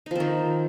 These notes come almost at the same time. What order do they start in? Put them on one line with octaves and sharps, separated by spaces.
D#4 F3 C4 D#3